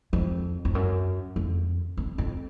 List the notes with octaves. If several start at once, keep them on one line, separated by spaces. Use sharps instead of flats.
F2
F2
F#2
F2
F2
F2